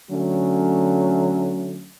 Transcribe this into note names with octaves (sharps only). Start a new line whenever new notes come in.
D3 F#3 A3 C#4